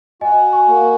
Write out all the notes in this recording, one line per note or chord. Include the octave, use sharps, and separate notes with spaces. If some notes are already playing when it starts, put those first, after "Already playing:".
F#4 D#5 G#5
G#5 C#6
A#3